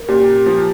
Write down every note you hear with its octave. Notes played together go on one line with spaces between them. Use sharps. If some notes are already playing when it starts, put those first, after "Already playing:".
Already playing: A#4
A#2 G4
F3